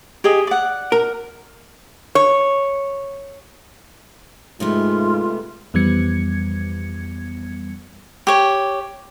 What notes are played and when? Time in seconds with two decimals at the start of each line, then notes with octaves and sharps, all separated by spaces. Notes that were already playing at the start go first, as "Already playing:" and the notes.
0.24 G4 G#4 D#5
0.47 D5 F#5
0.92 A#4
2.15 C#5
4.60 G#2 C3 G#3 A3 B3 F4
5.74 F2 E3 G3 B3 G#6 C#7
8.27 G4 C#5